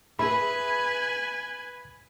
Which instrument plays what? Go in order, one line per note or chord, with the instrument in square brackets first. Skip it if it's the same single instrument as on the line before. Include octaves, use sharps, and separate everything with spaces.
[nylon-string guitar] G#4 E5 [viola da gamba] B4 [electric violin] G#5 [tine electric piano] B5